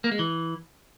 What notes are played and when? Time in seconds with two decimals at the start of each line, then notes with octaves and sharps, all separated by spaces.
0.04 A#3
0.12 G#3
0.19 E3